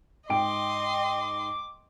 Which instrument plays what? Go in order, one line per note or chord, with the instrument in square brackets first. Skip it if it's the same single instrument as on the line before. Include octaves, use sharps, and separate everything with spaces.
[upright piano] G#2 G5 D7 [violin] D#5 C6 [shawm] D6